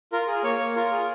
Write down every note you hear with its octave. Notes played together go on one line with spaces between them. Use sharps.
F4 A#4
G#4
A#3 C#5
A#3
F4 A#4
G#4